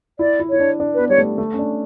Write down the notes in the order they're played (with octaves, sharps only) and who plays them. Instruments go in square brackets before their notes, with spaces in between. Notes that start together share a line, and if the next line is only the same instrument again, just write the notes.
[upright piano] E4 [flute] D5
[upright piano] E4
[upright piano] E4 [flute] C#5
[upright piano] D4
D4
[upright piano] B3 [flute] B4
[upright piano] G3 [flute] C#5
[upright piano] A3
A3
C#4
D4